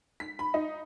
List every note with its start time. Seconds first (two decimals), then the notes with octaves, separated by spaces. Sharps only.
0.20 B6
0.39 B5
0.54 D#4